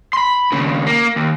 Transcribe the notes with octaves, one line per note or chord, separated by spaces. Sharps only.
B5 C6
D#2 C#3
A#3
D#2